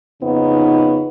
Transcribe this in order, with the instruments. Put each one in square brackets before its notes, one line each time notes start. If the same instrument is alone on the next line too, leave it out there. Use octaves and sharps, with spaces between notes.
[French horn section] F2 C#3 B3 D#4